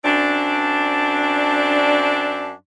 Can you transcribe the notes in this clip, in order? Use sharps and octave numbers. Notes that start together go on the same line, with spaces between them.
F#2 C4 D4